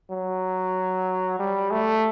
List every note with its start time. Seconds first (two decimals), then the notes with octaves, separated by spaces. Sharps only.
0.10 F#3
1.39 G3
1.71 A3